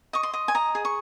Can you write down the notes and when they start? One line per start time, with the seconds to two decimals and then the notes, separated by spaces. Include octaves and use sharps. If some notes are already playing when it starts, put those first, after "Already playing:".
0.13 D#5 C#6
0.23 C6
0.34 D#5
0.48 G#5
0.55 D#5 A#5
0.75 G#4
0.85 C#6